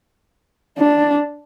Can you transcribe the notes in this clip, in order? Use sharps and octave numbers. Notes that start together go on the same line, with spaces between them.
D4